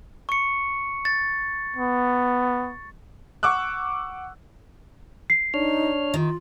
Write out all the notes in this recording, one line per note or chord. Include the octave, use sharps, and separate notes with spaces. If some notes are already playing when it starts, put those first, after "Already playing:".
C#6 C#7
A6
B3
F#5 C#6 D6 E6 F#6
C7
D4 D#4 C#5 F6
D#3 F4